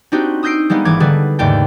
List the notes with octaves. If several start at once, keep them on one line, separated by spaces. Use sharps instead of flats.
C4 D4 D#4 F#4 G4
D#6 E6 G6 A#6 C7 D7
G3 G#3 A#3 B3 D#4
G#1 E3 D6 G#6
D3 G3 G#4 A4 B4
D#2 G#2 C#3 A3 D5 G5